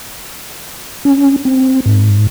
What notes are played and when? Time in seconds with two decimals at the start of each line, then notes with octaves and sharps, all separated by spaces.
1.05 C#4
1.45 C4
1.86 G#2